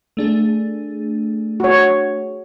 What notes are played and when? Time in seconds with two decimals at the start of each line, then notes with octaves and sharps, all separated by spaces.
0.17 A3 D4 G#4
1.60 F#4 C#5